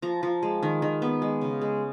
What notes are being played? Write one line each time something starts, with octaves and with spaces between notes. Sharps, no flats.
F3 A#5
F3
G#3
D#3
D#3
B3
G#3
C#3
G#3